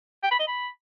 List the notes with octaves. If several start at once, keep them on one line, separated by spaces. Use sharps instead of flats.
G5
B5
D#5
B5